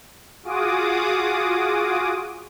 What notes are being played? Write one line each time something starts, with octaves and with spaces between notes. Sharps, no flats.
F4 F#4 G#4 D6 D#6